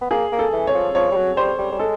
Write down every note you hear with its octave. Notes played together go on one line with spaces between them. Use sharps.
B3
A#3 G#4
A#3
A4
E3
C#5
F3
F3 C#5
G3
F#3
G3 C5
G3
G3
G#3 A4